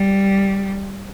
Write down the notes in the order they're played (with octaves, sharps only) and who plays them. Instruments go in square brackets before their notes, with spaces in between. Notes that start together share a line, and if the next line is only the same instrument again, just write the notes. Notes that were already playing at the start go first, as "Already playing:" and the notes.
Already playing: [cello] G3